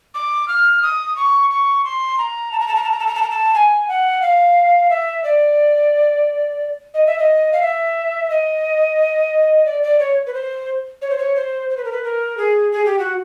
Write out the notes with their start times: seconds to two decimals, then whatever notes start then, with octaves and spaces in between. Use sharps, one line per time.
0.14 D6
0.48 F6
0.82 D#6
1.16 C#6
1.50 C#6
1.84 C6
2.18 A#5
2.52 A5
2.60 A#5
2.68 A5
2.76 A#5
2.84 A5
2.91 A#5
2.99 A5
3.07 A#5
3.15 A5
3.23 A#5
3.30 A5
3.54 G#5
3.88 F#5
4.22 F5
4.90 E5
5.24 D5
6.94 D#5
7.07 E5
7.19 D#5
7.52 F5
7.62 E5
8.30 D#5
9.66 D5
9.83 D5
10.00 C#5
10.26 B4
10.34 C5
11.02 C#5
11.10 C5
11.18 C#5
11.36 C5
11.70 C5
11.77 B4
11.85 A#4
11.92 B4
12.04 A#4
12.37 G#4
12.72 G#4
12.85 G4
12.99 F#4